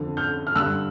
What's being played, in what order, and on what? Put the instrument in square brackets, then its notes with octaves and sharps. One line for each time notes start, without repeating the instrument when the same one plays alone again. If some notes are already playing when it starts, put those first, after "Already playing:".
Already playing: [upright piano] F2 D3
F6 G6
F6
G2 D3 E6 F#6